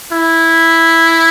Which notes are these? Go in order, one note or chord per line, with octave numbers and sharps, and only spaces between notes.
E4